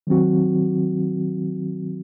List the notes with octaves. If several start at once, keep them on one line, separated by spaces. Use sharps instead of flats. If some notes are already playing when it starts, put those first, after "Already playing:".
D#3 F#3 C4 F#4